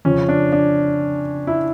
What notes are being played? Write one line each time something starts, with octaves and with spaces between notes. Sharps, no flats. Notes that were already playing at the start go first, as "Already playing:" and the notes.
F2 C#3 F3 C#4
D4
D4
E4